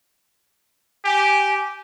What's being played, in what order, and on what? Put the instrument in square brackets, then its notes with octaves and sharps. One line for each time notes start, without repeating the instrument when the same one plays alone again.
[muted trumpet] G4 [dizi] G#5